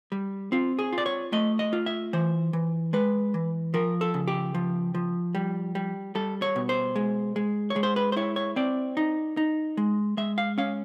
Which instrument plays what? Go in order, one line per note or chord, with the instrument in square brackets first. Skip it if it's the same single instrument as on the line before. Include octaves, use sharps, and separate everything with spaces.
[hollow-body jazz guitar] G3
C4 F4
G#4
F4
D5
C#5
A3 D#5
D#5
F4
E5
E3 C5
E3
G#3 B4
E3
F3 A#4
A4
C#3
G4
F3
F3
G3
G3
G3 A4
C#5
B2
C5
G#3
G#3
C#5
G#3
C5
B4
C5
E4 C#5
C#5
C4 D5
D#4
D#4
G#3
G#3 E5
F5
C#4 F5